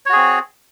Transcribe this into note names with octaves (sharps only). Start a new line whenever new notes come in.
C4 F#4 G#4 C#5